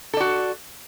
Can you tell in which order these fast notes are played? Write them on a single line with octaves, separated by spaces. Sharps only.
A4 D5 F#4